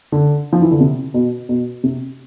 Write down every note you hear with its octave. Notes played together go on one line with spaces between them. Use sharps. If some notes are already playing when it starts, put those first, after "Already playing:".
D3
F3
E3
D3
C3
B2
B2
C3